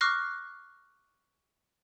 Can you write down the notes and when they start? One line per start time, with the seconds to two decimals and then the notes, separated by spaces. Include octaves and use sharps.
0.01 C#6 D6 F6 F#6 A#6 C7